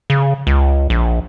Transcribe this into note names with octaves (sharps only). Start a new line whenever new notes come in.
C#3
C#2
A#1